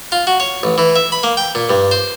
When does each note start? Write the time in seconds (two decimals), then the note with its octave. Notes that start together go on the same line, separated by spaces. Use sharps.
0.12 F4
0.27 F#4
0.40 C#5
0.63 A1
0.78 E3
0.96 E5
1.12 B5
1.23 A#3
1.37 G5
1.55 A#2
1.69 G2
1.91 C5